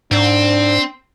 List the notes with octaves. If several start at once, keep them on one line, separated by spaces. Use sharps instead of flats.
G#2 C4 D4